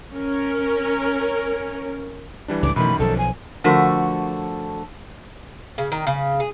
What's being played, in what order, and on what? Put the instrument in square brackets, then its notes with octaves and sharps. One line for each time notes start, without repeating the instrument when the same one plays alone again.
[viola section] C#4 A#4
[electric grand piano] E3 G3 D4
[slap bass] C#2 A2 [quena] D6
[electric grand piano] F#2 D#3 [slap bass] B2 E3 A3 [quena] B5
[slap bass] B1 F3 [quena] A4
[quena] G#5
[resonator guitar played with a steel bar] D3 F3 A3 F#4 A4 A#4
[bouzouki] C#3
D#3
C#3
G#4